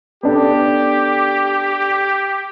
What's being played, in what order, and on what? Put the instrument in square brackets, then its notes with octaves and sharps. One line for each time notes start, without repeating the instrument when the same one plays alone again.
[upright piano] B3 D4 A4 [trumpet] G4